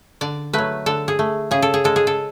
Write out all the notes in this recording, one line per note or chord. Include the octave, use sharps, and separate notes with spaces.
D3 D5
F#3 A3 B4
D3 A4
G#4
A3
C#3 G#4
A4
G#4
G#3 A4
G#4
A4